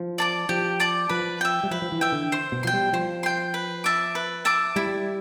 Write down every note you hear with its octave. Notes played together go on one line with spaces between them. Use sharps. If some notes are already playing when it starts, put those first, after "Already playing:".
Already playing: F3
D5 A5 D6
F3 G4
D5 A5 D6
F3 B4
E5 G5
G3
F3 B4
F3
E3
E5 G5
D3
C5
B2
F3 G5 C6
G3
F3 C5
G5 C6
B4
E5 A5 D6
B4
E5 A5 D6
G3 E4